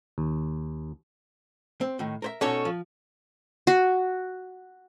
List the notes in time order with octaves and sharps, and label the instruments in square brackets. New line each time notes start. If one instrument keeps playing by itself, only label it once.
[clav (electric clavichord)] D#2
[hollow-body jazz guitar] C4
A2 D#3
A#4 C5 E5
[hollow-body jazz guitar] B2 D#4 F#4 [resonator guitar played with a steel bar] C#4 A4 C#5
[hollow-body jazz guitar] F3
[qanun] F#4